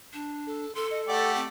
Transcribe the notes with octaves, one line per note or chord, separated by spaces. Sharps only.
D4
A4
A4 C6
D#5
A3 G4 D5 F#5
C4